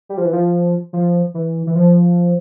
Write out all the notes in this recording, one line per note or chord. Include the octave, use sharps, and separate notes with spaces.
G3
F3
E3
F3
F3
E3
E3
F3